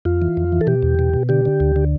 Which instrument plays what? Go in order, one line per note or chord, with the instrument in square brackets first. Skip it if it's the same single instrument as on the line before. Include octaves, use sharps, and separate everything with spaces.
[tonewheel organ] F2 F4
E3
F2
E3
A4
B2 G4
E2
B2
B2
D3 G4
D3
D2
D3